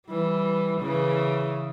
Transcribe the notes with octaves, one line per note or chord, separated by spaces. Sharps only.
E3 G3
C#3 E3